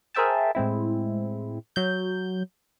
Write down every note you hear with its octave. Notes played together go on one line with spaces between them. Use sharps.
G#4 A#4 C5 E5 G5 A5
A2 G#3 C4 E4
F#3 G6